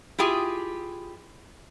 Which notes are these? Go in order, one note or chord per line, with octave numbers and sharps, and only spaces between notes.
E4 F4 G4 G#4